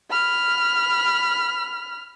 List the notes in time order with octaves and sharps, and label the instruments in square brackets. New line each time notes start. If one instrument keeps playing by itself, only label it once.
[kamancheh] B5 F6